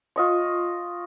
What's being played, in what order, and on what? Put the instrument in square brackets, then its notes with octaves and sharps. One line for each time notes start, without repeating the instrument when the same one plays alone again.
[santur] F4 D#5 C#6